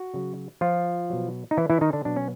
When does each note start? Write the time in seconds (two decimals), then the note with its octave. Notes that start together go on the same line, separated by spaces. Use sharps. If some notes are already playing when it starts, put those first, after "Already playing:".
Already playing: F#4
0.14 C#3 F#3
0.61 F3 F4
1.10 B2 F#3
1.51 D#4
1.57 E3 E4
1.70 E3 E4
1.81 D#3 D#4
1.93 D3 D4
2.05 B2 F#3 D4
2.16 C#4